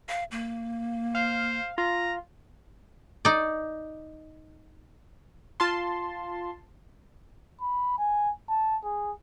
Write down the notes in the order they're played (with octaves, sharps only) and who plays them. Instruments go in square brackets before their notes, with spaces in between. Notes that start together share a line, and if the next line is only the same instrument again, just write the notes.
[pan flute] F5
A#3
[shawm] C5 [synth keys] F5
[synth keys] F4 [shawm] A#5
[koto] D#4 D5
[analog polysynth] F4 A5 C6
[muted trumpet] B5
G#5
A5
G#4